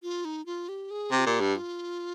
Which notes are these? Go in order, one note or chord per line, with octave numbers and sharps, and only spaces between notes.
F4
D#4
F4
G4
G#4
C3 G4
F4
A#2 G4
G2
F4